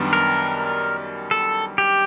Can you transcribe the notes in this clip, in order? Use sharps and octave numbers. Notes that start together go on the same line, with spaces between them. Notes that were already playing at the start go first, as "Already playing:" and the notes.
Already playing: F#2 D#3 G3 B3 D4
A#4
A4
G4